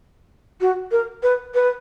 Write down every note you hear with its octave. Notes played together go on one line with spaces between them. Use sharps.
F#4
A#4
B4
B4